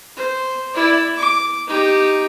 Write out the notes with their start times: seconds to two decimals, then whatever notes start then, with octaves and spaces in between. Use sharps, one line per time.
0.17 C5
0.75 E4 D5
1.17 D6
1.67 D#4 G4